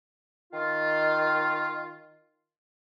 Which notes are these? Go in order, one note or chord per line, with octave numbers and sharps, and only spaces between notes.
D#3 F4